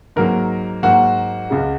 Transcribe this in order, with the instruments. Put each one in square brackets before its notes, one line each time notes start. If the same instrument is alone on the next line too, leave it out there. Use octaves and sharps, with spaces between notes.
[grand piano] G#2 F#3 A#3 [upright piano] A#4
[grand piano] G#2 F#3 A#3 [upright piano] F#4
[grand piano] C#2 C#3 G#3